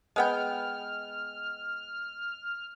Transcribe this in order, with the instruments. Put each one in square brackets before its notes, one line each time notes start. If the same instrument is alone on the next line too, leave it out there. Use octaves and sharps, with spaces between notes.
[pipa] G#3 B3 G5 [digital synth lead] F6